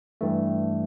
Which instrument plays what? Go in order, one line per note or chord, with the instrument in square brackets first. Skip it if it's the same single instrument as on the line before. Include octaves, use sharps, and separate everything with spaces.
[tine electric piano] G2 E3 A3